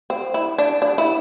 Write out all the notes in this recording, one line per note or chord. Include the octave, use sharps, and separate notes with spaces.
C4
E4
D4
D4
E4